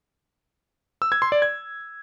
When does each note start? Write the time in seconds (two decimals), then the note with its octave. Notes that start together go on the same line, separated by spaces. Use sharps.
1.02 E6
1.12 G#6
1.22 C6
1.32 D5
1.42 G#6